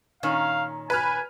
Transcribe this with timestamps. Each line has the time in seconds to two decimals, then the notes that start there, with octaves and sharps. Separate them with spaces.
0.23 A#2 D#3 C#4 F5
0.90 B4 G#5 B5 F6